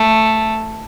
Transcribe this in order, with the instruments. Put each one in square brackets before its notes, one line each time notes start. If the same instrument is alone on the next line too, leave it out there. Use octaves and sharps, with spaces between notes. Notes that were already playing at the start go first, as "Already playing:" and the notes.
Already playing: [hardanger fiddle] A3